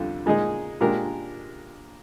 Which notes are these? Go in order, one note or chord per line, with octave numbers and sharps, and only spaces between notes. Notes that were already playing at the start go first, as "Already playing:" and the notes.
Already playing: F2 D3 G3
A#2 G#3 D#4 G#4
A#2 G#3 D4 G4 A#4